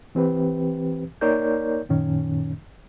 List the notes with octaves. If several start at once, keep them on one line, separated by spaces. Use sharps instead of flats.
E3 C4 G4 B4
A#3 D#4 A#4 C#5 D5 G6
F#2 A#2 D#3 C#4